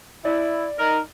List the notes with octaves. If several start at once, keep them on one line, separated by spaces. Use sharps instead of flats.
E4 D5
D#4 A#4